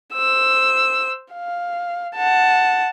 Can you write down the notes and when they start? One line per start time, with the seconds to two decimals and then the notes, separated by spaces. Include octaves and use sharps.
0.14 C5 E6
1.33 F5
2.17 F#5 A5